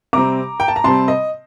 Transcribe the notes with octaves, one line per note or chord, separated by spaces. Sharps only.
C3 G3 C4 A#5 D6
G5
A5
A#5
C3 G3 C4 A5 C6
D#5